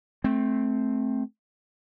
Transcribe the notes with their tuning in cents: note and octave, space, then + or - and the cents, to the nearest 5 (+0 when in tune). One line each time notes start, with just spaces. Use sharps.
A3 -15 C4 +0